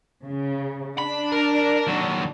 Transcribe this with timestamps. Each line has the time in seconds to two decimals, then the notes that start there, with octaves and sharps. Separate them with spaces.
0.22 C#3
0.98 D4 B5
1.32 A#4
1.87 D#2 F#3